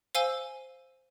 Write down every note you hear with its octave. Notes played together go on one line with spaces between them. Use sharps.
C5 F5 G#5 E6 D#7 G7